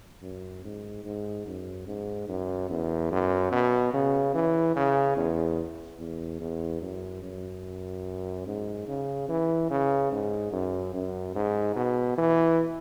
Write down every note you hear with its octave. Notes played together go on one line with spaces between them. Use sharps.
F#2
G#2
G#2
F#2
G#2
F#2
E2
F#2
B2
C#3
E3
C#3
E2
E2
E2
F#2
F#2
G#2
C#3
E3
C#3
G#2
F#2
F#2
G#2
B2
E3